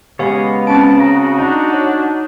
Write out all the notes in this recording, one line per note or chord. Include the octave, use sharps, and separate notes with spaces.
C#3 G#3 B3 G4 C#5 F5
C4 C#4 A5 D7
F#4 A#5
D4 D#4
C#5